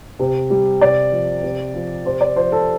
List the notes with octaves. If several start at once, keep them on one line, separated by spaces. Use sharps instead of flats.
C3
G3
C3 D5
F3
C3
F3
C3 C5
D5
F3 C5
A4